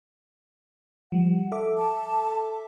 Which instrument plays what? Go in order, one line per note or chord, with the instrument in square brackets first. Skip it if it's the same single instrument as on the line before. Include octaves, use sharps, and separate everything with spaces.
[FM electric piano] F3 G3 [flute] F#5
[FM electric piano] A4 E5 D6
[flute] A5